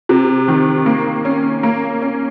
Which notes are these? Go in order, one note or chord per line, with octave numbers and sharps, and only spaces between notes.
C3
D#3
A#3
C#4
A#3
C#4